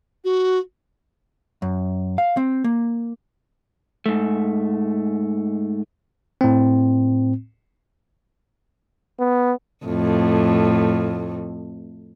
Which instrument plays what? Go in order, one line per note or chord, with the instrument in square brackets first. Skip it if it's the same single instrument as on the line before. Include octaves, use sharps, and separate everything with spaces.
[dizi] F#4
[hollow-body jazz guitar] F#2
F5
C4
A#3
[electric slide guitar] G#2 A3
[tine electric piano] A2 C4
[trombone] B3
[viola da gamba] F2 A2